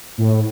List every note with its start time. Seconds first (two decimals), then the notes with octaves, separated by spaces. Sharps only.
0.18 A2